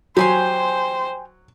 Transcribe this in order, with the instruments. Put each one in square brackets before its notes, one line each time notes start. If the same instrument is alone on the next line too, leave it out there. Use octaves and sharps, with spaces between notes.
[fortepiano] F#3 [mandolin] G4 G#5 C6 [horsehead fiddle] C5